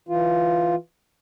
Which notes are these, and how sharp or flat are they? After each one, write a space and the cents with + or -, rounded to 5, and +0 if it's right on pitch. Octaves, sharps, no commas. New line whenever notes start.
E3 +0 F4 +0